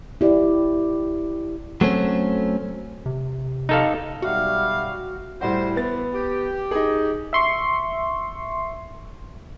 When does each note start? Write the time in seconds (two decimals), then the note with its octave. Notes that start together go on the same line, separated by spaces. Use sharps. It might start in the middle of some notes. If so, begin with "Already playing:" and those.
0.21 E4 G4 D5
1.81 F#3 A3 C4 C#4
3.06 C3
3.69 D#4 A4 F5
4.22 B1 G3 F#4 E5 F5
5.41 A2 G3 F#4 C5
5.76 E3 B3 A6
6.14 G4
6.71 D#4 G#4
7.33 E5 C6 C#6